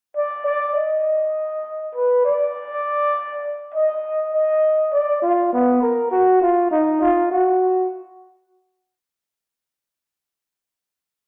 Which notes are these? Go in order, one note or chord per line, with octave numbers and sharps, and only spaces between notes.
D5
D5
D#5
B4
D5
D#5
D#5
D5
F4
B3
A#4
F#4
F4
D#4
F4
F#4